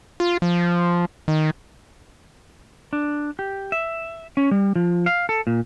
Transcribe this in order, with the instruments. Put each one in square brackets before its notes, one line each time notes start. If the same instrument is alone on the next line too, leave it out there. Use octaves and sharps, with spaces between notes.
[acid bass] F4
F3
D#3
[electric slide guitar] D4
G4
E5
C#4
G3
F3
F5
A4
A#2